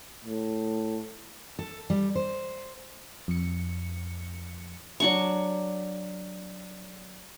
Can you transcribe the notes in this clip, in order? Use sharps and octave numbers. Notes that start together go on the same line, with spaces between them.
A2
A4
G3
C5
F2 C#7
F#3 D4 C#6